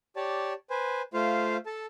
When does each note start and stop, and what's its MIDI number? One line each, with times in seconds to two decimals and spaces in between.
0.16 0.53 67
0.16 0.53 73
0.16 0.53 74
0.16 0.53 81
0.70 1.02 71
0.70 1.02 72
0.70 1.02 80
1.14 1.57 57
1.14 1.57 65
1.14 1.57 72
1.14 1.57 77
1.66 1.86 69
1.66 1.86 81